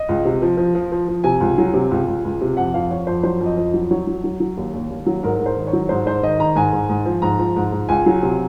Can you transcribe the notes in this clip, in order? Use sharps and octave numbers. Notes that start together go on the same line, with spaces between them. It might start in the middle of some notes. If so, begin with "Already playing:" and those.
Already playing: D#5
C#2
C3
F3
F3
F3
F3
F3
C3 G#5
C#2
F#3
C3
C#2
C#2
C#2
C3
F2 F#5
F2 F5
F2 C#5
F2 C5
F#3 C5
F2
D#5
F2
F#3
F#3 C#5
F#3
F#3
F#3
D#2
D#2
D#2
F#3
G#2 A#4
G#2
C5
D#3
C#5
F#3
G#2 C5
G#2 C5
D#3 D#5
D#3 A#5
G#2 G#5
G#2
G#2
F3
G#2 A#5
F3
G#2
G#2
C#2 G#5
F#3
C3